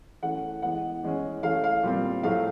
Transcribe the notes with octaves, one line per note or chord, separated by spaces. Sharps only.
E3 A3 C#4 F#5
E3 G#3 B3 F#5
E3 G#3 C#4
E3 A3 C#4 F5
F5
A#2 G3 C4
A2 F#3 A3 F5